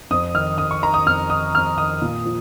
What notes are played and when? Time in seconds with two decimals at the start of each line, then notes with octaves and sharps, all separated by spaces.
0.11 F2 D#6
0.34 D#3 F6
0.58 F2 D#6
0.71 C#6
0.82 D#3 A#5
0.94 D#6
1.06 F2 F6
1.30 D#3 D#6
1.55 F2 F6
1.77 D#3 D#6
2.02 A#2
2.25 F3